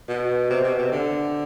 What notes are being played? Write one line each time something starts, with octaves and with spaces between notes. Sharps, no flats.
B2
C3
B2
C3
D3